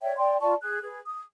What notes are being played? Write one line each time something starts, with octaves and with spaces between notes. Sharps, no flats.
C#5 D5 E5 G5
D5 G5 C6
F4 D5 A5 C#6
G#4 F#6
G#4 B4
D#6